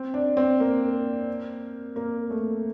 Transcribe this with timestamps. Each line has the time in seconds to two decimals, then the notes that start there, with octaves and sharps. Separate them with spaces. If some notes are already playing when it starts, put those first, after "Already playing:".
Already playing: C4
0.14 D4
0.37 C4
0.60 A#3
1.96 A#3
2.30 A3